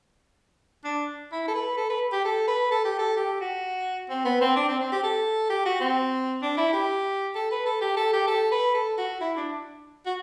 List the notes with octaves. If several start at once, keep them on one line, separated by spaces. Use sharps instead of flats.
D4
E4
A4
B4
A4
B4
G4
A4
B4
A4
G4
A4
G4
F#4
C4
B3
C4
D4
C4
C4
G4
A4
G4
F#4
C4
D4
E4
G4
A4
B4
A4
G4
A4
G4
A4
B4
A4
F#4
E4
D4
F#4